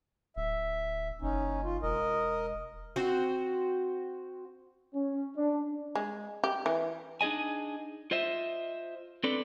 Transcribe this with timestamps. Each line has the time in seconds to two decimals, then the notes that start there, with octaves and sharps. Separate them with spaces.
0.36 D1 E5
1.22 F#1 C#4 D#4
1.64 F4
1.83 E1 A#4 D#5
2.96 C4 F#4 C5
4.95 C#4
5.37 D4
5.95 G#3
6.44 G4
6.66 E3
7.21 D4 D#4 G#4 D#5 G#5
8.11 F4 C5 D#5 E5
9.24 C4 D4 A4 B4 D5